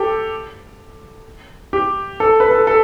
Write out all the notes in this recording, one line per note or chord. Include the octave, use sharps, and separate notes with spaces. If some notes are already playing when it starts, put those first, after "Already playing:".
Already playing: G4 A4
G4
A4
B4
A4
A4